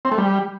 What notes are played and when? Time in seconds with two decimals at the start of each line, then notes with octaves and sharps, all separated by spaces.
0.05 C4
0.12 A3
0.18 G3